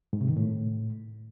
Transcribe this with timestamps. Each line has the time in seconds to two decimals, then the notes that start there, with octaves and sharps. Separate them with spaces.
0.13 G#2
0.21 C3
0.29 D#3
0.37 A2